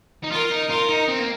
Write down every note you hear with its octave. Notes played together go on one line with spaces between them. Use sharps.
D#4
F4 A#4
D#4
F4 A#4
D#4
C4
A#3